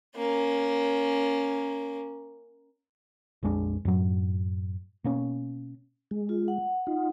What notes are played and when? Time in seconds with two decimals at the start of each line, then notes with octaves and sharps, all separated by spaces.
0.16 A#3 C#4
3.43 A#1 F2 G#3 D4
3.85 F#2 A2 F#3
5.04 B2 A#3 C#4
6.11 G#3
6.29 F4
6.48 F#5
6.87 D#4 F4